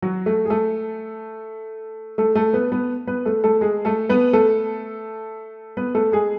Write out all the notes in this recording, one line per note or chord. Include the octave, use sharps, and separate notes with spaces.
F#3 F#4
A3 A4
G#4
A3 A4
A3 A4
A3 A4
B3 B4
B3 B4
B3 B4
A3 A4
A3 A4
G#3 G#4
A3 A4
B3 B4
A3 A4
B3 B4
A3 A4
G#3 G#4